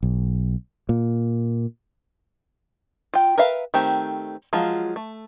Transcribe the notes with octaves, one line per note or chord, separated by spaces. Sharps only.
B1
A#2
F4 G5
A#4 B4 E5 F5
D#3 A3 C4 G4
F3 F#3 G#3 F4
A3